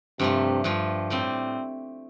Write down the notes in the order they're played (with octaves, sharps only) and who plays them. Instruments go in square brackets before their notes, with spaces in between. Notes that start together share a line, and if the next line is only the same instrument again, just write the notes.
[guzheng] G2 F3 A3 [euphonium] C3
[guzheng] G2 F3 A3
A2 G3 C4